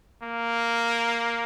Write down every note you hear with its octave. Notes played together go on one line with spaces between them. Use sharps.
A#3